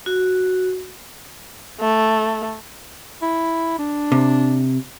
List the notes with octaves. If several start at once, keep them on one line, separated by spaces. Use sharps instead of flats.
F#4
A3
E4
D4
C3